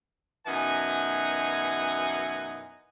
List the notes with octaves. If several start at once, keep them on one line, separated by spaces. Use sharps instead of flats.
F#2 B2 E3 D#4 F#5 G#5